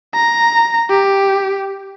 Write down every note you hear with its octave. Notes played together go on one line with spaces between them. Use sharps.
A#5
G4